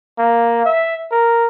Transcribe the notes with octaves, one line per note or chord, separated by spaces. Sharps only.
A#3
E5
A#4